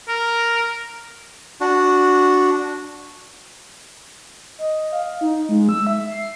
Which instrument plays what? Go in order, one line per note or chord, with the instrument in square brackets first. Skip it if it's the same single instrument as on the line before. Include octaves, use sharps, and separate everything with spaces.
[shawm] A#4
[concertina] D4 F#4
[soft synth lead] D#5
F5
D#4
G#3
E6
E5
C7